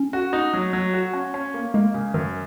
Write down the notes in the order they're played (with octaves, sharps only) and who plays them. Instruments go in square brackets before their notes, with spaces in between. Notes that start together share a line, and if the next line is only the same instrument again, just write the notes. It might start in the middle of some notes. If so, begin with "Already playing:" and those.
Already playing: [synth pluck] C#4
[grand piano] F#4
D#4
F#3
F#3
F#4
C#4
C#4
A#3
[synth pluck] G#3 [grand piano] A#3
[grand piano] C#3
[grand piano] F#2 [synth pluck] D#3